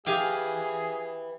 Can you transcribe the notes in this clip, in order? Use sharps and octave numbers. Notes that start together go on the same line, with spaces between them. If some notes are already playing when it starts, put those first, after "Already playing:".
G4 G#4 B4 E5 F5 G#5